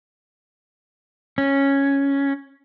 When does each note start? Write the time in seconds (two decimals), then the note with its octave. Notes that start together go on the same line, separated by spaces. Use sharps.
1.38 C#4